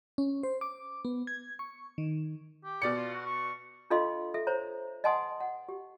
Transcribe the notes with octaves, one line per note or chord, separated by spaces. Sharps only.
C#4
C5
D6
B3
G#6
C#6
D#3
G4
B2 D5 C#7
F4
F#4
C#6
D4 F4 A4 D#5 F5 C6
A4 E5
C5 C#5 A#5
D#5 F#5 G#5 A5 C6 D#6
F#5
G4